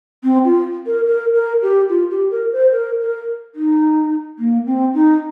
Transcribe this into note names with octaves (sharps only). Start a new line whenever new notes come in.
C4
F4
A#4
A#4
A#4
G4
F4
G4
A#4
C5
A#4
A#4
D#4
A#3
C4
D#4